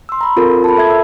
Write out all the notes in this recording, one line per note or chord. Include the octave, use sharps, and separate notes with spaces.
C6 E6
A#5 B5
C4 F4 A4 A#4
A5 B5
A4 E5 G#6
E6